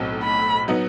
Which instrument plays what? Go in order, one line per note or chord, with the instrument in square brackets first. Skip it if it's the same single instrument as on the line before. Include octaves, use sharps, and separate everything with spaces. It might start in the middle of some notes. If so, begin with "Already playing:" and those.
Already playing: [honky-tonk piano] B1 A2 F#3 C4
[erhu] B5
[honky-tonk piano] F#3 B3 D#4 F#4